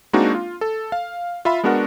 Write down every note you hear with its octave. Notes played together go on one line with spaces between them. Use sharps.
G#3 A#3 C4 D4 D#4 F#4
F4
A4
F5
F4 E5 B5
G#3 B3 D4 F#4 A#4 F#5